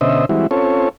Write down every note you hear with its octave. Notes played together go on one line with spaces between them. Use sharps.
B2 D3 C#4 C5 D#5 E5
E3 G3 G#3 C4 E4 F#4
C4 C#4 F4 A4 C#5